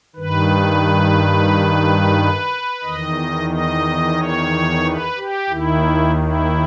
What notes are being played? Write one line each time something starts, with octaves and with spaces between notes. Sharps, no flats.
G2 D#3 B4
E2 D#3 D#5
D#5
C#5
B4
G4
D#2 D#3 E4
E4